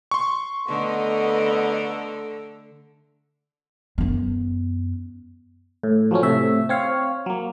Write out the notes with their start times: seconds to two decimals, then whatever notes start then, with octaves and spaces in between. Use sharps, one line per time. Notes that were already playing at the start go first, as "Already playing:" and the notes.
0.11 C6 C#6
0.68 D3 A3 B3 D#5 A#5
3.98 F#2 B3
5.83 A2
6.11 F3 F#3 A3 C#4
6.23 A2 C3 E5
6.69 C4 C#5 F5
7.26 F#3 A#3